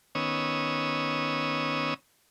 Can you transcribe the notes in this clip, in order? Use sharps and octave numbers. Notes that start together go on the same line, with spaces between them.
D#3 B3 C#4 C#5 D#6 E6